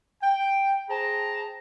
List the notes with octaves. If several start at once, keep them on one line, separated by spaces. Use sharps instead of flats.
G5
G#4 C5 G5 A5 A#5